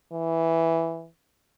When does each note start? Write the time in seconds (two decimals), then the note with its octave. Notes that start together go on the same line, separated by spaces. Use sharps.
0.12 E3